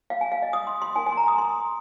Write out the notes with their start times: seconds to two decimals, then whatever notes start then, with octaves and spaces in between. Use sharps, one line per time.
0.10 F5
0.21 G#5
0.32 F5
0.42 D#5
0.53 D#6
0.67 C6
0.82 C6
0.96 D#4 A#4 G#5
1.06 G#5
1.12 C6
1.17 A#5
1.28 D#6
1.38 C6